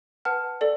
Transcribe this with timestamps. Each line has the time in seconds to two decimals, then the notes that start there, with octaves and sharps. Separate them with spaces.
0.25 B4 F#5 A5 F6
0.61 A4 D5